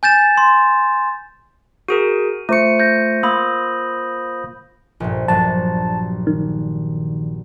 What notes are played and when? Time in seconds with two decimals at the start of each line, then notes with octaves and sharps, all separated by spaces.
0.03 G#5 G6 A6 E7
0.37 C6
1.88 F#4 G#4 A#4 D#7
2.49 A3 F4 C5 C#6 C#7 D#7
2.79 G6 A#6
3.23 A#3 B5 D#6 F#7
5.00 A#1 G2
5.28 A#1 G2 F#3 A5
6.27 D#3